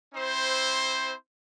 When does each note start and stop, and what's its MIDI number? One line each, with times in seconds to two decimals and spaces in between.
0.14 1.14 60
0.14 1.14 64
0.14 1.14 72